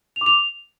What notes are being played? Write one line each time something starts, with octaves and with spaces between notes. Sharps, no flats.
F7
D6
F7